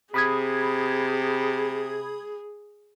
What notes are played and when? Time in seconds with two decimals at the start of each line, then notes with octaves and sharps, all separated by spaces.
0.14 C3 G#4 B5 D#6 G#6